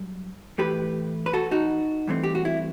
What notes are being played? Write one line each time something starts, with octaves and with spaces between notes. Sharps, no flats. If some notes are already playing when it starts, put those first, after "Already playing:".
Already playing: G2 F#3
A2 E3 A3 G4 B4
B4
F#4 A4
D#4 F#4
G2 E3 A3 C4
G4
F#4
E4